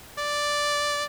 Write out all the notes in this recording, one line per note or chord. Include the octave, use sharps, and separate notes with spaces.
D5